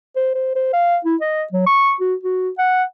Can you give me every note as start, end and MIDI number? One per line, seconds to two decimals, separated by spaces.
0.16 0.32 72
0.35 0.51 72
0.55 0.69 72
0.73 0.97 77
1.05 1.16 64
1.21 1.43 75
1.53 1.64 54
1.66 1.94 85
2.00 2.15 66
2.23 2.49 66
2.58 2.84 78